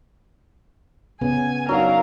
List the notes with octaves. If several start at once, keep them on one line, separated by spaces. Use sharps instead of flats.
C#3 B3 C#4 G#5
F#3 D4 D#4 A#4 F5 F#5